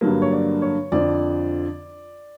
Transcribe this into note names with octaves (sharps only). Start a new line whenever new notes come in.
G2 D3 F#3 A#3
C#5
D5
C#5
F2 D3 F3 D5